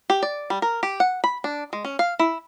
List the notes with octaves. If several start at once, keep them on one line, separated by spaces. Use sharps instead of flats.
G4
D5
G3
A#4
G4
F#5
B5
D4
G#3
C#4
F5
E4